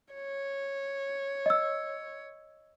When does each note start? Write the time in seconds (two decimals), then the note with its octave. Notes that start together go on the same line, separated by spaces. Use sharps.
0.14 C#5
1.46 D#5 E6